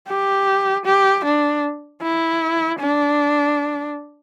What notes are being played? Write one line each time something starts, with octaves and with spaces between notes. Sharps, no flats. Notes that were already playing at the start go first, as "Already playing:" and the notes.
G4
G4
D4
E4
D4